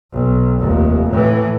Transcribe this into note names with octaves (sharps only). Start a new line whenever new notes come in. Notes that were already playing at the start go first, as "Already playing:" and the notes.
B1
F1 D#2
A2 E3